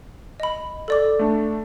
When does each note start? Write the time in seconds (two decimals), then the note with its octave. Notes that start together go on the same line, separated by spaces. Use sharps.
0.40 D#5 B5
0.88 A4 D5 D6
1.19 A3 D4